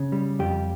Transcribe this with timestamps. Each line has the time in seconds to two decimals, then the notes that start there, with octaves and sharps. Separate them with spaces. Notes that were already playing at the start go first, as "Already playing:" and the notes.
Already playing: C#3
0.12 G3
0.39 F2 G4